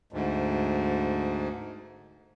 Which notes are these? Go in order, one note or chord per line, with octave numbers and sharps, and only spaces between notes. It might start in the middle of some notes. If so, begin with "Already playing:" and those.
D2 G#2